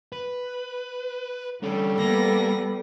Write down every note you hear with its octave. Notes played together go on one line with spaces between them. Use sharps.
B4
D3 G3 C#4 A4
A#3 B3 A#6